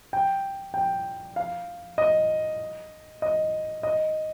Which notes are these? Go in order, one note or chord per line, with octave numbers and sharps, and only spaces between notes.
G5
G5
F5
D#5
D#5
D#5